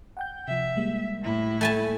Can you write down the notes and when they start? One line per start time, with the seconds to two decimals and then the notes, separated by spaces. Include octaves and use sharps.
0.17 F#5 G5 G6
0.48 C3 F3 E5
0.77 G3 G#3 A#3
1.22 A2 E4
1.61 A3 G#5 A5